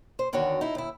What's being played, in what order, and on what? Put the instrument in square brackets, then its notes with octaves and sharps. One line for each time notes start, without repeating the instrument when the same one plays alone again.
[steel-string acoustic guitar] C5
E2 D3 D#3 F#4 C#5
D#4 E4
D#2 E4